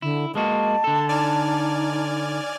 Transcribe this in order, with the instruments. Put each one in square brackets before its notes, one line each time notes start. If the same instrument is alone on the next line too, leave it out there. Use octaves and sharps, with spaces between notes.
[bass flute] D3 [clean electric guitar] E4
[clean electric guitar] G#3 A#3 F#4 [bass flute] D#5 [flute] A5
[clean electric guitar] D3 A4
[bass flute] D#4 [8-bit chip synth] D5 G#5 F6